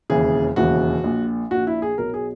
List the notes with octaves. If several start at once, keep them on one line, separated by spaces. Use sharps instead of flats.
E1 D#2 C#3 E3 G#4
E1 D#2 C#3 E3 F#4
A#1 A#2
A#1 A#2 F#4
E4
G#4
B1 B2 A#4
G#4